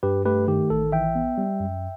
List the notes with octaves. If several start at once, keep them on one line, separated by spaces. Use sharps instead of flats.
G2 G4 B4
A3 G4 B4
D#3 G4
A1 A4
E3 E5 G5
B3
G3
F#2